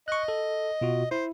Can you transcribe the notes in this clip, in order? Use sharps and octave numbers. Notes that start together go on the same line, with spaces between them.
D#5 C#6 F#6
A4
B2 F4 F#4
E4 C5